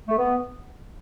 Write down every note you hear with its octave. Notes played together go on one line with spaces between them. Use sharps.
A3
B3